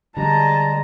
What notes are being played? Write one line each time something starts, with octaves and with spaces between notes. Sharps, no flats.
D3 G3 G#3 A5 A#5